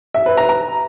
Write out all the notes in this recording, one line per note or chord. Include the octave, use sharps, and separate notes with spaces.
E5
B4
A#5
A#5